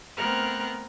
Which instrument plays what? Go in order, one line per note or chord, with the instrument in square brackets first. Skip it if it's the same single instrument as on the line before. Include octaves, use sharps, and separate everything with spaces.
[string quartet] A3 B3 C4 A#4 F6 F#6